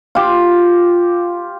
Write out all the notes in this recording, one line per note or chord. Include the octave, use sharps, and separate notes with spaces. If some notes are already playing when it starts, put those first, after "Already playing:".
F4 G4